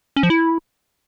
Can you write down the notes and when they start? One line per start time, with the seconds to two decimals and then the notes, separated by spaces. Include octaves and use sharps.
0.16 C#4
0.23 F3
0.30 E4